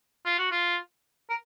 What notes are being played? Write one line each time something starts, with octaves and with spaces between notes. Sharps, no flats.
F4
F#4
F4
A#4